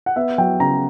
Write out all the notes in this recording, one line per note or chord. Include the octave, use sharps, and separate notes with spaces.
F#5
B3 E5
F#3 G5
C#3 A#5